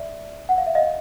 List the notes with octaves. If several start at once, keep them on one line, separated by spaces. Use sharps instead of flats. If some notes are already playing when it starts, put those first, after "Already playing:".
Already playing: D5 E5
F#5
F5
E5
D#5 F5